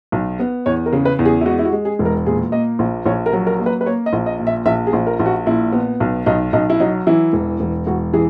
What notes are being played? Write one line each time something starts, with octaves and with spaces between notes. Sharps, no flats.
B1
B3
E2 C#5
A#4
C#3
B4
E2
G#4
E4
G#3 F#4
E4
F#4
G#3
G#4
E1
A#4
A#2 G#4
A#3 D#5
A#1
A#1 C#5
A#4
F#3
A#4
A#3
B4
B4
A#3 C#5
D#5
A#1
D#5
A#2
E5
A#1 E5
G#4
A#1
A#4
A#1
F#4
A#2 E4
B3
B1
B1 D#4
B1 D#4
E4
F#3 D#4
E3 E4
E1
E1
E1 F#4
E3 G#4